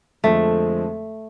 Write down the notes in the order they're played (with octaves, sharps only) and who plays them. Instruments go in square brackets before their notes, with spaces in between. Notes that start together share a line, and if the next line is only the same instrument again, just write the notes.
[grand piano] F2 D3 F3 G#3 C4 [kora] A3